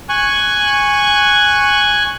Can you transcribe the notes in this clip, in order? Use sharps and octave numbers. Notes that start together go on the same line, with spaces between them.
G#5 C#6 F#6